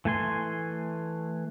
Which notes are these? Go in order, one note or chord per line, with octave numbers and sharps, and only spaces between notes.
E3 A3 G#5 C6